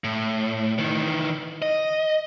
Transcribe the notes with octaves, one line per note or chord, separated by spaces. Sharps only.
A2
D#3 E3
D#5